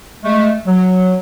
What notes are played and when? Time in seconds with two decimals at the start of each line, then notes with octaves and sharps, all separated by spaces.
0.23 G#3 A3
0.66 F#3